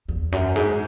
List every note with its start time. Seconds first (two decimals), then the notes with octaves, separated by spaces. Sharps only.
0.09 E2
0.32 F#2
0.56 G#2